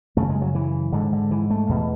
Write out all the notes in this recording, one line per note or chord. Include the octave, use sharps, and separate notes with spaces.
F#2 C#3 A3
G#3
F#3
E3
G#2 D3
D3
E3
A3
E2 B2